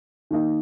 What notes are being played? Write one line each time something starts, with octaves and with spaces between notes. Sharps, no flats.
D#3 A#3 D#4